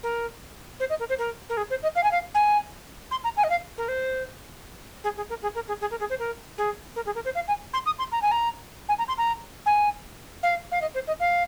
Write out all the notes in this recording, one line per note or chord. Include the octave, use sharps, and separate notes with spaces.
A#4
C5
D#5
A#4
C5
A#4
A#4
G#4
C5
D#5
F5
G#5
F5
G#5
C6
A#5
G#5
D#5
F5
A#4
C5
G#4
G#4
A#4
G#4
A#4
G#4
G#4
A#4
G#4
C5
A#4
G#4
A#4
G#4
A#4
C5
F5
G#5
C6
D#6
C6
A#5
G#5
A#5
G#5
A#5
C6
A#5
G#5
F5
F5
D#5
C5
D#5
F5